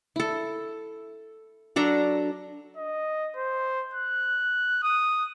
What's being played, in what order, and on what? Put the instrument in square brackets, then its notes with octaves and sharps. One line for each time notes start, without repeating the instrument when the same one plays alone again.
[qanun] E4 A4
F#3 D4 A4 A#5
[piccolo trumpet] D#5
C5
F#6
D#6